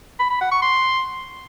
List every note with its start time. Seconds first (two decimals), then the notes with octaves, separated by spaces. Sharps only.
0.20 B5
0.30 B5
0.41 F#5
0.52 C#6
0.62 C6